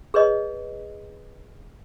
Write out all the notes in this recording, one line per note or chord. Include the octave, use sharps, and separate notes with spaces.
G#4 B4 C#5 D#5